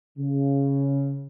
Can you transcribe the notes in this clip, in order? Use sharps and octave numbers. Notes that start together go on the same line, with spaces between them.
C#3